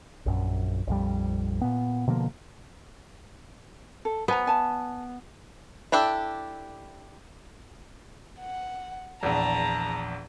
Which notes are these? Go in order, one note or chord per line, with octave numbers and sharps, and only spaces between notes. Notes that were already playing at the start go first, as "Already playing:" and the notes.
A#1 F#2
A#1 F2 G3
A#2 B3
B2 D3 F3 A#3
A4
B3 C5 G#5 A#5
D5 G#5 A5
D4 E4 G4 A4
F#5
A#1 E2 A5 A#5